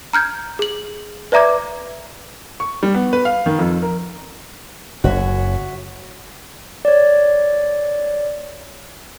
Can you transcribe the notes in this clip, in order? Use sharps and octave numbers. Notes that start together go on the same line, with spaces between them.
A#5 F6 G6 G#6
G#4 F#7
B4 D5 E5 A#5 D6 G#6
C#6
G3
B3
B4
F5
D#3
F2
A#4
F#1 F#2 F#4 C#5 E5
C#5 D5